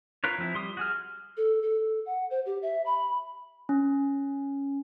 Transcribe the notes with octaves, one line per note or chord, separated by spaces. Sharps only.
F4 A#4 B4 C#5
F3 C4 E4
G3 C6 D#6
F#4 G#4 F6
A4
A4
F#5
C5
G4
E5
B5
C#4